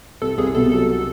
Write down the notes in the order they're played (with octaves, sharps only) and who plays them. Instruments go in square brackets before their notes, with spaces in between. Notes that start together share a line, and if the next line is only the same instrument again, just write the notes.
[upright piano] C2 [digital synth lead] A4
[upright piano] C2 [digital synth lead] G#4
[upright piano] B2 [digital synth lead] A4
[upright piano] F#3 [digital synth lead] A4